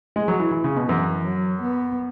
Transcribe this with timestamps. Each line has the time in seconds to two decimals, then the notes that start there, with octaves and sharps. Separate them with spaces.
0.16 G#3
0.28 F#3
0.39 E3
0.51 E3
0.64 C#3
0.76 B2
0.88 F#2 E3
1.25 F#3
1.62 B3